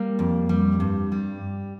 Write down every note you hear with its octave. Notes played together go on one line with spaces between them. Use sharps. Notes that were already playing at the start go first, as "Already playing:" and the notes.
Already playing: G3 A#3
F2
G3
G2
G3